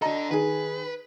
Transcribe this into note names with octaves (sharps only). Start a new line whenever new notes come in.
D4 A4 D#5 A#5
D#3 G#4 B4